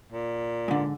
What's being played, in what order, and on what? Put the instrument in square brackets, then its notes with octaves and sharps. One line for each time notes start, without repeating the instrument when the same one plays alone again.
[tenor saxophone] A#2
[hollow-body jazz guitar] G#2 D3